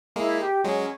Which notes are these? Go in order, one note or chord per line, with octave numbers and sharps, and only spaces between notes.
G#3 A#3 E4
G4
F#3 G#3 C#4